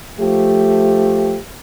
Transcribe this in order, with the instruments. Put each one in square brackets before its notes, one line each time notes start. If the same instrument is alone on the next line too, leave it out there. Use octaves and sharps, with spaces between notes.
[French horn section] F3 A3 G4